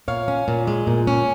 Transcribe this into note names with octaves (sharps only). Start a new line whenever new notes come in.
A#2 C#5 F5
C#4
A#2
G#3
A#2
C#4